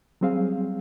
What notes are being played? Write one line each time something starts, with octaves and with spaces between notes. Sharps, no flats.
F#3 G3 C4 G#4 F5